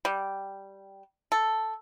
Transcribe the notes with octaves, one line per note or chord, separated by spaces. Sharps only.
G3
A4